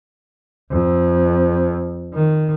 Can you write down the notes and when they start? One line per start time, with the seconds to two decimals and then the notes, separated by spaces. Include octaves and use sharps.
0.71 F2
2.14 D#3